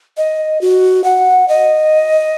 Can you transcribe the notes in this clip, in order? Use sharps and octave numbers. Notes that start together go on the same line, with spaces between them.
D#5
F#4
F#5
D#5